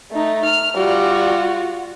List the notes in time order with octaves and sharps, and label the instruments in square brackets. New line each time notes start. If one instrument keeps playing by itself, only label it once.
[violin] A3 D#4
F6
[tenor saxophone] G3 [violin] F4 F#4